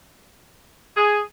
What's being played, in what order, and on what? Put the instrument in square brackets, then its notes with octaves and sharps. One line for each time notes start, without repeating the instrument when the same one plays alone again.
[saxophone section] G#4